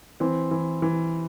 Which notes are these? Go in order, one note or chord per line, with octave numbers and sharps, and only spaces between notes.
E3 C4
E3
E3